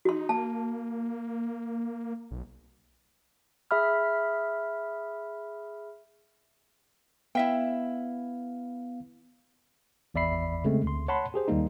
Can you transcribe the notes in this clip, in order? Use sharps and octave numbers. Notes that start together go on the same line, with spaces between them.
D#4 F#4 C6
A#3 A5
B1
G#4 E5 B5 F6
B3 E4 E5 F5 G5
G#1 E2 D5 E5 B5 C7
C#3 G#3 A3 C4
D2 C6
C#5 F#5 A5 B5 C6
G4 G#4 C5
D#2 G3 A#3 D#4